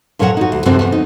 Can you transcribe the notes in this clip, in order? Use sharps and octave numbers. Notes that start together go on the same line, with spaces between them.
F2 A#2 F#3 A#4 C#5 F#5
D#4 F#4
D2
F#2 C3 F3 C4 F#4
E2
D#4